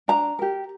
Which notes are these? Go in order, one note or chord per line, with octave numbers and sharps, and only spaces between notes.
D4 A#5
G4 A#4